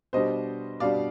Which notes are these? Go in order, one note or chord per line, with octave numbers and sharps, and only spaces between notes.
B2 G3 D4 C5 D#5
B2 G3 D4 D5 F5